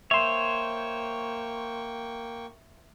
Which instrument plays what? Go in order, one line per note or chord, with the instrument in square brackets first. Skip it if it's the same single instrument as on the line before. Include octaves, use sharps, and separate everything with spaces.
[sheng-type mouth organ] A#3 G5 C#6 [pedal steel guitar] C5 C#5 [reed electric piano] E5 C6